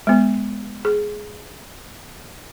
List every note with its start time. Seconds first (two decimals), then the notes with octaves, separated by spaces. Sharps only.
0.07 G#3 B3
0.85 G#4